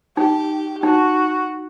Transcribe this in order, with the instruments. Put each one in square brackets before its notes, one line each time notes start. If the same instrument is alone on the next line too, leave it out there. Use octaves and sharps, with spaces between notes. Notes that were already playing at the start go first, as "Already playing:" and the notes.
[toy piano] D#4 [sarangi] G4
[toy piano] D#4 [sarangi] F#4